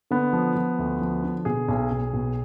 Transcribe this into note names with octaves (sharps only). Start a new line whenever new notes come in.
D3 B3
F3
F3
D2
F3
D3
B2 G#4
B1
B1
B2